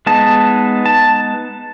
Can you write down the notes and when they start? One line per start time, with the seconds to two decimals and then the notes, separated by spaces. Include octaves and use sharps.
0.06 G#3 B3 D#4 A5
0.86 A5